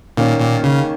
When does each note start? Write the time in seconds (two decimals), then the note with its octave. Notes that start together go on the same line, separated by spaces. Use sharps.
0.17 A#2 D#3 A#3 C#4
0.40 A#2
0.64 C#3